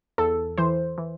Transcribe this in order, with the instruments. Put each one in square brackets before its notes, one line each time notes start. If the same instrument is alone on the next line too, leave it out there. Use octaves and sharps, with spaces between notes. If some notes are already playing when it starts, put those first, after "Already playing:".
[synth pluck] E2 A4
E3 C5
E3